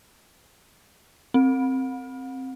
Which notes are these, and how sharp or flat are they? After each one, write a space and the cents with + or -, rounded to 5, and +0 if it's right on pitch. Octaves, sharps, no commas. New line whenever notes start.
C4 +5